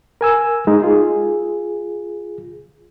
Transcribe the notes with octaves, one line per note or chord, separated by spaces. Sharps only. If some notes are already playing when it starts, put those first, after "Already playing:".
A#4 G#5 E6
G#3 D#4
F4 G#4